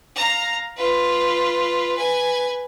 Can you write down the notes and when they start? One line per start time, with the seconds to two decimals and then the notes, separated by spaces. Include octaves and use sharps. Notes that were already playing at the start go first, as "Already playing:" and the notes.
0.16 F5 A#5
0.77 F4 B4
1.95 B4 G#5